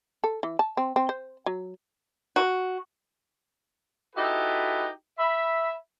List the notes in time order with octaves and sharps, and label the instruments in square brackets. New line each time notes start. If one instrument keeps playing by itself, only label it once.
[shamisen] A4
E3
A5
C4
C4
C5
F#3
[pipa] F#4
[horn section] D#4 E4 F#4 G4 A4 B4
E5 B5